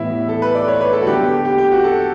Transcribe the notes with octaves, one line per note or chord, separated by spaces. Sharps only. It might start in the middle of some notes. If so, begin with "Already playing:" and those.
Already playing: A2 E3 G3 B3 E4
A4
B4
D5
C#5
B4
A4
F#4
D3 F#3 B3 G4
G4
G4
G4
F#4
A4